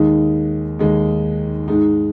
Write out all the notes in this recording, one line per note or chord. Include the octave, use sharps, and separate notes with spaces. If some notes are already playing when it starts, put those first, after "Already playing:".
Already playing: D#2 D#3 G#3 D#4
D#2 D#3 G#3 D#4
G#2 G#3 D#4